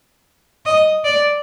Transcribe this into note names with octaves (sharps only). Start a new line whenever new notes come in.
D#5
D5